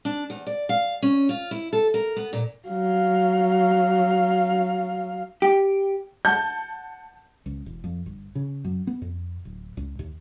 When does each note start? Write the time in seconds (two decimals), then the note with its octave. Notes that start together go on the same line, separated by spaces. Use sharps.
0.05 D4
0.30 E2
0.47 D5
0.69 F5
1.02 C#4
1.29 F4
1.51 E4
1.73 A4
1.94 A#4
2.16 B3
2.33 A#2
2.68 F#3 F5
5.42 G4
6.25 F#5 A5 G6
7.46 C#2
7.66 E1
7.84 F2
8.06 G1
8.35 C#3
8.65 F#2
8.87 B3
9.02 F2
9.45 D1
9.77 C#2
9.99 D#2